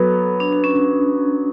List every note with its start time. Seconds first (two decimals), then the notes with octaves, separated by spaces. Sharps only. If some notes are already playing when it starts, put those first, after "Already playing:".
Already playing: F#3 B3 A4
0.40 D4
0.52 D4
0.64 C#4